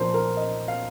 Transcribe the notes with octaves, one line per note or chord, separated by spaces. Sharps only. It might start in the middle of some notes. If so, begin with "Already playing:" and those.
Already playing: A#2 F3 D4 A#4 C5
A#4
D#5
F5